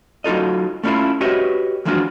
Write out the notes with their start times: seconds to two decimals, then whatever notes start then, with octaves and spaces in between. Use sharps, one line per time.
0.24 F#3 D#4 F4 A4 D#5
0.83 A3 C#4 D4 E4 F4 A4
1.21 F#4 G4 B4 C#5 D#5 E5
1.85 E3 F3 G#3 D4 F4 F#4